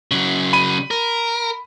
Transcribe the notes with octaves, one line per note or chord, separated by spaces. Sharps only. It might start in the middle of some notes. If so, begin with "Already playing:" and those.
C#3 F#3
B5 D#7
A#4